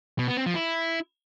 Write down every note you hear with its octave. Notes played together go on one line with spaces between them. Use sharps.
B2
B3
C4
F3
E4